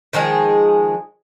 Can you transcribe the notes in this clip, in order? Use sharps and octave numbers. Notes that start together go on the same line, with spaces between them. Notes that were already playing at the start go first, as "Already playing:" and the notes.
D#3 F3 G#3 G#4